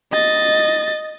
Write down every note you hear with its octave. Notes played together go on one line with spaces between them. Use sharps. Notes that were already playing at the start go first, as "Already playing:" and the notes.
D#5 A6